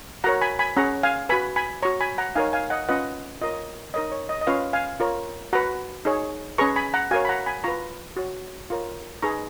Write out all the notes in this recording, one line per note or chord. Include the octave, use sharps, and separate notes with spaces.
F#4 A#4 C#5 F#5 A#5
G#5 B5
G#5 B5
C#4 G#4 C#5 F#5 A#5
F5 G#5
F#4 B4 G#5 B5
G#5 B5
F#4 C#5 A#5 C#6
G#5 B5
F#5 A#5
D#4 A#4 C#5 F5 G#5
F5 G#5
D#5 F#5
C#4 F4 B4 D#5 F#5
F4 A#4 C#5 D#5
D#4 A#4 C#5 D#5
C#5
D#5
D#5
C#4 F4 B4 C#5 F5
F5 G#5
F4 A#4 C#5
F#4 B4 F#5 A#5
D#4 G#4 C#5
C#4 G#4 B4 A#5 C#6
G#5 B5
F#5 A#5
F#4 A#4 C#5 F5 G#5
B5
F#5 A#5
G#5 B5
F4 B4 A#5 C#6
F#4 C#5
F4 A#4 C#5
D#4 G#4 B4 A#5 C#6